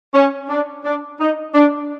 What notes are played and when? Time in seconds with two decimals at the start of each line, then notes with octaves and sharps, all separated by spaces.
0.14 C#4
0.50 D4
0.85 D4
1.21 D#4
1.55 D4